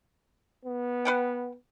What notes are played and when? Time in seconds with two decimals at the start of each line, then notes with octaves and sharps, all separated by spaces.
0.65 B3
1.05 B4 F#5 G5